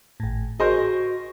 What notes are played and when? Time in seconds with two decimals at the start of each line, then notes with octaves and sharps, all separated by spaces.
0.20 G#1 A2
0.60 F#4 G#4 A#4 C5 D#5